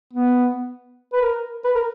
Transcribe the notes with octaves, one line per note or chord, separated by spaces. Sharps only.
B3
B4
A#4
B4
A#4